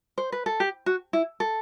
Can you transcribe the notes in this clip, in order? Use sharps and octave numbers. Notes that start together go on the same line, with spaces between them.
C5
B4
A4
G4
F#4
E4
A4